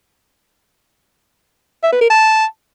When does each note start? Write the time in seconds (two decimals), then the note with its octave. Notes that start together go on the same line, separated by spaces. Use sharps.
1.83 E5
1.92 B4
2.01 A#4
2.10 A5